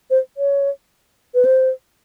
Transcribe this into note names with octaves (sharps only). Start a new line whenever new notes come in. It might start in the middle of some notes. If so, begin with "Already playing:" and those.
C5
C#5
B4
C5